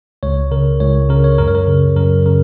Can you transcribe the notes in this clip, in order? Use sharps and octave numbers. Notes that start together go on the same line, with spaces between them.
C#2 C#5
C#3 A#4
C#2 C#5
C#3 A#4
C#5
F#2 A#4
C#5
A#4
C#3
F#2 A#4
C#3 A#4